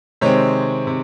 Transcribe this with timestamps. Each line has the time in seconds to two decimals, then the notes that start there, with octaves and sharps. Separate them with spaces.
0.21 C3 D#3 G#3 C4 C#5
0.87 C3